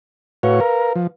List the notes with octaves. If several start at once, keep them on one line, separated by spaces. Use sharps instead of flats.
A2 F#4 B4 C#5 F5
A#4
F3